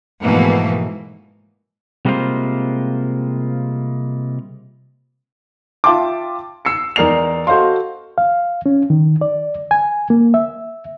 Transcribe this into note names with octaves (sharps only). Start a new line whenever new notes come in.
G#2 B2 E3 F3 A3 A#3
C3 G3 G#3 A#3 F4 C5
F4 E5 G5 A5 C6 D6
E6 C7 C#7
E2 D#4 A#4 D5 C7 F7
F#4 A4 C5 D#5 F5 C6
F5
C#4
D#3
D5
G#5
A#3
E5